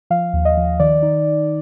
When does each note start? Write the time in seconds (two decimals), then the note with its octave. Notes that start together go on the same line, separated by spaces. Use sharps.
0.10 F3 F5
0.33 D#2
0.45 D#5
0.57 F3
0.80 D#3 D5
1.02 D#4